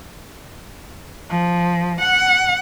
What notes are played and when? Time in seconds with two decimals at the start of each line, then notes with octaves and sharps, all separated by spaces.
1.30 F3
2.01 F#5